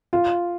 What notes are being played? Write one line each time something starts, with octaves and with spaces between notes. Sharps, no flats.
F4